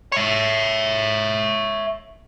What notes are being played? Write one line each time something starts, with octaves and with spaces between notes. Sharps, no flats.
C#5 E5